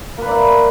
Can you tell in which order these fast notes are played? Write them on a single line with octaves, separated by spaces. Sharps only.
A#3 B4 D5 E4